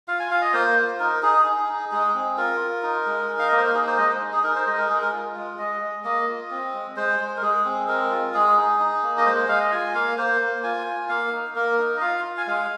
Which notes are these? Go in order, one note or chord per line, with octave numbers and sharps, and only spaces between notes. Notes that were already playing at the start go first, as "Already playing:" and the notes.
F4 F5
G#5
F4 F5
D#5
A#3 C5
F4
D#4 A#4
D#4 G#4
D#4
D#4
G#3 G#4
C4
F4 A#4
F4
D#4
G#3
D#4
F5
A#3 D#5
C5
A#4
D#4 G#4
C5
G#3 D#5
C5
D#4
G#4
D#4 A#4
C5
G#3 D#5
A#4
G#3 G#4
A#4
F4
G#3
G#3 D#5
G#3
A#3 D#5
F4
C4
G#3
G#3 C5
G#3
A#4
G#3 G#4
C4
G#3 A#4
F4
G#3 G#4
D#4
D#4
A#3
D#5
G#3 C5
C5
G#3 F5
D#5
F4 G#5
A#3 F5
A#3 C5
A#3
F4 G#5
F4
A#3 F5
D#4
A#3 A#4
D#4
D#5
F4 F5
F4
G#5
G#3 F5